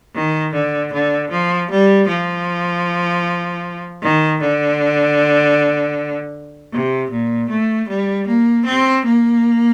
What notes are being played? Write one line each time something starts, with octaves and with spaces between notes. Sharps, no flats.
D#3
D3
D3
F3
G3
F3
D#3
D3
C3
A#2
A3
G3
A#3
C4
A#3